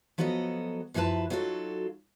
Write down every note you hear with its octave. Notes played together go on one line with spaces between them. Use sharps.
F3 F#3 B3 F#4 A4 D#5
F#2 F3 E4 F#4 B4 A5
F#3 D#4 F4 F#4 A4